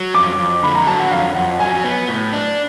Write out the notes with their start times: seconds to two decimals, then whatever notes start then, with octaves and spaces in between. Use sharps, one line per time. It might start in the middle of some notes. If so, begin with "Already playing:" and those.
Already playing: F#3
0.14 F2 D6
0.38 F2
0.63 D3 B5
0.75 A#5
0.87 F#3 A5
0.99 F#5
1.11 F2 F5
1.35 F2 F#5
1.60 F#3 G#5
1.84 B3
2.08 A2
2.33 D4